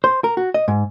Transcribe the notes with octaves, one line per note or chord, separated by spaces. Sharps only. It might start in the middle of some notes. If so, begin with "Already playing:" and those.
C5
A#4
F#4
D#5
G#2